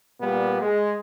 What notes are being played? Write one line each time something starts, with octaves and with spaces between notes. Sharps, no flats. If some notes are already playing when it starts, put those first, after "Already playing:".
A#2 G3 A#3 B3
G#3